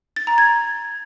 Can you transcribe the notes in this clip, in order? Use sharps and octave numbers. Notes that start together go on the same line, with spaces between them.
A6
A#5
G#6